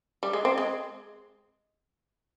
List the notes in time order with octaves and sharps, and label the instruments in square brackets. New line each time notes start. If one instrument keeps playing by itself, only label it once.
[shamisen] G3
G#3
C4
G#3